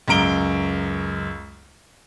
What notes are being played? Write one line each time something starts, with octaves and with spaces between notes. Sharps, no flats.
C#2 F#2 A#5 D7 G7